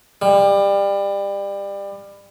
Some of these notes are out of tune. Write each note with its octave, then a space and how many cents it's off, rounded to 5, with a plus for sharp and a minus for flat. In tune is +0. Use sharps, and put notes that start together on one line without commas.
G3 +25